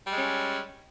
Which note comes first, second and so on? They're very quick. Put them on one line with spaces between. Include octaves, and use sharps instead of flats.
G3 G#3 C#4